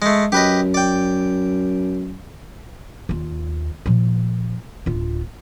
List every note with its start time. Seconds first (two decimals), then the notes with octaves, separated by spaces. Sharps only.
0.02 G#3 A3
0.32 F#2 G4 B4 D#5
0.74 D5 G5
3.09 D#2 F4
3.86 A#2 F3
4.86 D1 F4